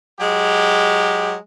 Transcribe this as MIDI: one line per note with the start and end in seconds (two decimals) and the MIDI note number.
0.19 1.35 54
0.19 1.35 56
0.19 1.35 67